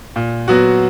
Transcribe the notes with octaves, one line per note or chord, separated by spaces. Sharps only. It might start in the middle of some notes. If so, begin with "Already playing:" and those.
A#2
F#3 B3 F#4